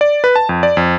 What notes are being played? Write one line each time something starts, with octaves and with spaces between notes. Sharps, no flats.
D5
B4
A5
F2
D5
F2